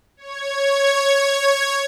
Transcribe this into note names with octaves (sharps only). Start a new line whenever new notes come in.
C#5 G#6